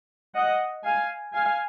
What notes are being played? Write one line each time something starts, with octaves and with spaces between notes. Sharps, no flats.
D#5 F#5
F5 G#5
F5 G#5